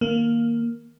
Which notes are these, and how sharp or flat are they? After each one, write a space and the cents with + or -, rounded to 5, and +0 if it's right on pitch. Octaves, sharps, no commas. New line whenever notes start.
D#3 +0 A#3 +0